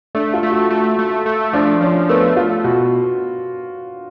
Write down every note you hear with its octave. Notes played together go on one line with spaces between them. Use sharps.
A3 D4
F4
A3
F#4
A3 F#4
A3
A3
F3 D4
F3 C#4
A3 B3
A3 F4
B2 F#4